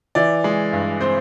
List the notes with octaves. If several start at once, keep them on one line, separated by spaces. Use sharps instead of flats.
E3 D5
G#3
G2
C4 C5